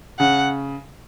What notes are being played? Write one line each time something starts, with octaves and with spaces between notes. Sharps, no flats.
C#3 F#5